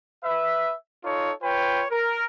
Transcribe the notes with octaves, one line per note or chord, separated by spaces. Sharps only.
B4 E5
D#4 F4 A4 C#5
F4 B4 C#5 G5
A#4